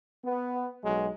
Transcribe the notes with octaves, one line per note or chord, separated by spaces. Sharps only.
B3
B1 F#3 G#3